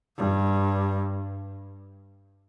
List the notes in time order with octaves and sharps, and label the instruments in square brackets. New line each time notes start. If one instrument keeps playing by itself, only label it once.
[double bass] G2